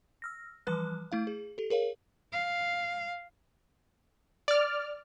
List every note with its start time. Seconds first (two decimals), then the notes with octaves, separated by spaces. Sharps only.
0.22 E6 F6 A#6
0.67 E3 F3 G3 B4 F#6
1.12 A3 E4 F5
1.27 G#4
1.58 G4 A4
1.70 G#4 A#4 C#5 F5
2.32 F5
4.48 D5 F6